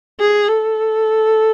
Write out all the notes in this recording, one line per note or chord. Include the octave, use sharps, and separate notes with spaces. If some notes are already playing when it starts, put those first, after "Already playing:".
G#4
A4